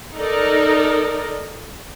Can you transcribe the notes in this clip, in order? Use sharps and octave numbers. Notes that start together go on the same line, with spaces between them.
D#4 A4 A#4 D5 D#5